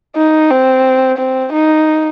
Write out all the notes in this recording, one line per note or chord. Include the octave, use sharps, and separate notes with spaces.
D#4
C4
C4
D#4